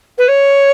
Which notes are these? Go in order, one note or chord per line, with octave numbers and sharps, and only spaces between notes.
B4
C#5